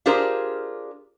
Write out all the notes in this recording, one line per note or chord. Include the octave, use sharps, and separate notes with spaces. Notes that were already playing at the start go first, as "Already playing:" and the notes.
D4 F4 G4 G#4 A#4 C5